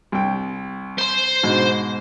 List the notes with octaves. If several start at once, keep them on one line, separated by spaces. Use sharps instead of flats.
C2 G5
C5 C6
G#2 B2